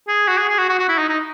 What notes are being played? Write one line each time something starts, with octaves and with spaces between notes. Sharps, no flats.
G#4
F#4
G#4
G#4
F#4
F#4
F#4
E4
D#4
D#4